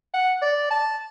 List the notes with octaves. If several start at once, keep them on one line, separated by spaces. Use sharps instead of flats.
F#5
D5
A5